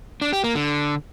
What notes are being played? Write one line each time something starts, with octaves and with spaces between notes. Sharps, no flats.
D4
G4
A#3
D3